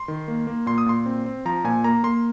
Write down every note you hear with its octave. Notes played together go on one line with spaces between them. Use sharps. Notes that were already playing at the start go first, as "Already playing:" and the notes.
Already playing: C6
D#3
A#3
A#3
A#2 C6
D#6
A#2 C6
C4
C4
F3 A#5
A#2 G#5
A#3 A#5
A#3 C6